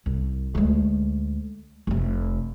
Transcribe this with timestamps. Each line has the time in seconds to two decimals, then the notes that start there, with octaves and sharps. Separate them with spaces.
0.06 C2
0.55 D2 G#3
1.87 F1 C3